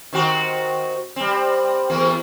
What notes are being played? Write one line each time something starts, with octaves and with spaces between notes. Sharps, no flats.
D#3 C4 F#4
G3 C4
E2 A#3